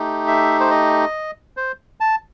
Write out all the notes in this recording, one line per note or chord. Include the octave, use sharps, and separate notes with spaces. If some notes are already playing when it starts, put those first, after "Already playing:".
Already playing: A3 D#4 G4
E5
C5
D#5
C5
A5